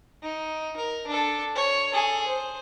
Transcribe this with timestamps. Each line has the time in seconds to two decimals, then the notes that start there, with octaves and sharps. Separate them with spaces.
0.23 D#4
0.77 A#4
1.07 D4 A4
1.55 C#5
1.93 G#4 A4
2.27 C5